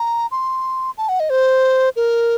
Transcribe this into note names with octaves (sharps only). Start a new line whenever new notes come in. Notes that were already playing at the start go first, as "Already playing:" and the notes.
Already playing: A#5
C6
A5
F#5
D#5
C5
A#4